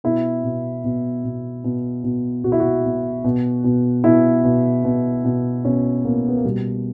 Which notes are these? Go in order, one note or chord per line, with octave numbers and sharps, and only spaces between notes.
B2 E4
B2
B2
B2
B2
B2
B2 F#4
E4
F#4
B2
B2
B2
B2 E4
B2
B2
B2
B2 C#4
B2 A#3
B3
A#3
B2 G3